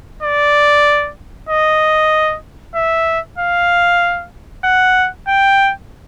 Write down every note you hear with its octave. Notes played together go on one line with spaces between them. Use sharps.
D5
D#5
E5
F5
F#5
G5